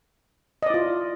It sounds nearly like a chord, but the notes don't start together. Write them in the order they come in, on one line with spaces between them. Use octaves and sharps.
D#5 D5 E4 F4